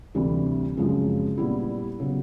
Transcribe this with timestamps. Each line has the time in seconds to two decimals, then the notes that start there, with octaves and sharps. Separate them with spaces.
0.15 D2 C3 E3 G3
0.77 F#2 C#3 F3 G#3 C4
1.38 A#2 G3 B3 E4
2.00 C#3 F#3 B3